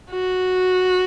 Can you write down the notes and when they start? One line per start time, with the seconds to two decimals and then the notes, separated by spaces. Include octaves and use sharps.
0.10 F#4